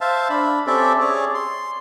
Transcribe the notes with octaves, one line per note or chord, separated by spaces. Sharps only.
C5 E5 F5 A5
D4 B5
C4 C#4 G4 A4 D5 E5
G#4 C#5 D5
C6